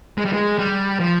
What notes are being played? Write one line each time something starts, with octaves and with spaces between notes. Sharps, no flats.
G#3
G3
G#3
G3
F3